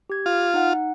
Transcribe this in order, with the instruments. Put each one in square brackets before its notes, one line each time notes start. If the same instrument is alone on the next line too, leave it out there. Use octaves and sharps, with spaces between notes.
[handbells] G4 G#6
[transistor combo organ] F4
[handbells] D#4 F#5